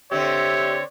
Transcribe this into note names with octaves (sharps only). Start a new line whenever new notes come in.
D3 C4 G4 C#5 E5